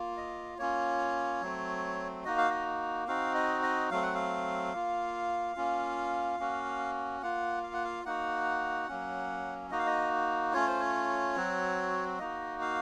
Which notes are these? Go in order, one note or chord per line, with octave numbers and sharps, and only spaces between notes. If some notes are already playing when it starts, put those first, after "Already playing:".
Already playing: A#3 F4
D#5
A#3 C#4 F4 C#5
F#3 A3 C4
A#3 D#4 F#4 D#5
F5
D#5
C4 D#4 F#4 F5
D#5
D#5
F#3 A3 C4 F5
F#5
F5
A#3 F4
A#3 C#4 F4
A#3 C#4 F#4
A#3 F4 F#5
F5
F#5
F5
A#3 D#4 F#4 F#5
F#3 A#3 C#4
A#3 D#4 F#4 D#5
F5
D#5
A3 C#4 F4 C#5
C5
C#5
F#3 C4 F#4
A#3 D#4 F#4 D#5
F5